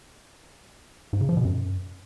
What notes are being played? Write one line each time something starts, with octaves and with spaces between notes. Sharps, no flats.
G#2
C#3
F3
B2
F#2